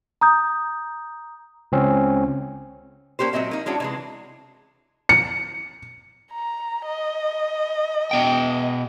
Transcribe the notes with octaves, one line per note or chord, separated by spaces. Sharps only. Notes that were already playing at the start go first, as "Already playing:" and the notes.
A#5 D#6 G6
C#2 C4 C#4
A#3 C#4 G4 C5
A#2 F#3 C4 D#5 E5
A#3 D#4
G#3 C#4 D4 E4 F#4
C3 E3 G#3
C#7
A#5
D#5
B2 G5